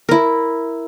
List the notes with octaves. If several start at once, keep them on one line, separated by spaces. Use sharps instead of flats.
E4 A#4